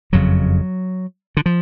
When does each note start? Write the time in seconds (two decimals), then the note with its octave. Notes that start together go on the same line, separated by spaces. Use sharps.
0.12 F#1 F2 C#3 F#3
1.37 D3
1.46 F3